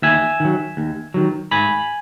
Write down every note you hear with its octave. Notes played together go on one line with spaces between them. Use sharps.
D#2 E5 G#5
D#3 F#3
D#2
D#3 F#3
G#2 G#5 B5